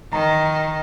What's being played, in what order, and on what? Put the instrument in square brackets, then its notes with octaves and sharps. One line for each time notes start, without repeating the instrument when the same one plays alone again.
[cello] D#3 [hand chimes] A#5